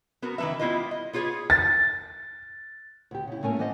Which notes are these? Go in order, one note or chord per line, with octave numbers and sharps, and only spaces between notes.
B3 F#4 A#4
D#3 E3 A3 B4 E5
G3 B3 E4 F4 B4 D#5
D#5
B3 F4 G#4 C#5
A6
D2 G4
C#3 E4
A2 A3 A#3 C#4 A#4 G#5
E3 G3 B3 C5 D#5